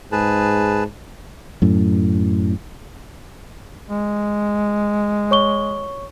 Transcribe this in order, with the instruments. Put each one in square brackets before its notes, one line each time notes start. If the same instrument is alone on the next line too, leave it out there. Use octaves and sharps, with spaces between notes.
[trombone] G#2 [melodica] G#4 B4 A5
[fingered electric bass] F#2 A2
[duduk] G#3
[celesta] C#5 C#6 G7